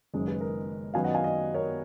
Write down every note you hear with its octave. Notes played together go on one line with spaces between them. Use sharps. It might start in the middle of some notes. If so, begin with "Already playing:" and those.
F#1 F#2 D#3 G#3
G#4 B4
A#4
F#2 D#3 F#3 B3 F5 G#5
D#5 F#5
F5 G#5
B4 D#5
A#4 C#5